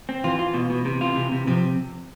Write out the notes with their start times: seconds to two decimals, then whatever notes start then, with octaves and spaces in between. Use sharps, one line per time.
0.09 C4
0.24 E3 F4
0.39 F4
0.54 B2
0.70 B2
0.85 C3
1.01 F4
1.15 C3
1.32 C3
1.47 C3 F3